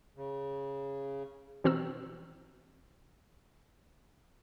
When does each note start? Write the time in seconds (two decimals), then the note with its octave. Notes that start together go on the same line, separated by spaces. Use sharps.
0.17 C#3
1.64 B2 E3 C4 F#4 A#5 E6